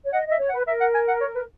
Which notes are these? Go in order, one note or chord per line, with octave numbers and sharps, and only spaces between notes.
C#5
D#5 F#5
D#5
E5
C#5
F#5
B4
A#4 E5
F#5
G#5
F#5
C#5
B4